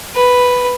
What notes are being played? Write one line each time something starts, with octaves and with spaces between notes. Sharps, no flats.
B4